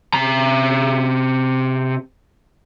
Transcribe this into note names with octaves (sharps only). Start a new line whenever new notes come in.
C3 A#5